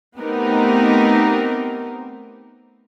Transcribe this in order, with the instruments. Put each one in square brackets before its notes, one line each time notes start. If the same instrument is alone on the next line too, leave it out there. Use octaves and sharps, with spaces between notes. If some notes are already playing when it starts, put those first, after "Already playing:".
[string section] A3 B3 C4 D#4 G4 A#4